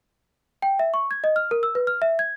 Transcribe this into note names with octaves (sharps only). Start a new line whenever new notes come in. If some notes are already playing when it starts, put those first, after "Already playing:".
G5
E5
C#6
G#6
D#5
F6
A#4
E6
B4
F6
E5
G#6